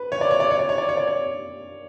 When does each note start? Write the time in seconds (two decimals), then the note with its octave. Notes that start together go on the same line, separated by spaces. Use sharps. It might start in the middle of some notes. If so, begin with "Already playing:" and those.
Already playing: B4
0.12 C#5
0.21 D5
0.31 C#5
0.40 D5
0.51 C#5
0.59 D5
0.69 C#5
0.78 D5
0.89 C#5
0.97 D5
1.07 C#5